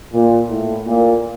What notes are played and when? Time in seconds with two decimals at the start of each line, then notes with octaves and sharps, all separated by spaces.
0.13 A#2
0.50 A2
0.86 A#2